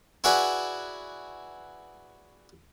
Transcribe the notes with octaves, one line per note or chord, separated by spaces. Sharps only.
E4 F#4 G#4 B4 D5 E5